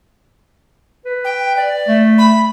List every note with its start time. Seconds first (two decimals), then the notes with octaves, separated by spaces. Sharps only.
1.05 B4
1.25 G5
1.57 D5
1.88 A3
2.18 B5